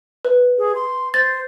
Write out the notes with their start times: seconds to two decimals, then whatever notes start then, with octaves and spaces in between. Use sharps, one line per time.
0.25 B4
0.58 G#4
0.75 C6
1.14 C5 A6